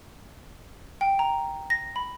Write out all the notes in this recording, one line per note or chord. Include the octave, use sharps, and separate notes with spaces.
G5
A#5
A#6
B5